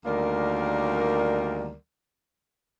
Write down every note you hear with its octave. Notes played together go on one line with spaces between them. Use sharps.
D2 D#3 G3 A#3 A#4 D5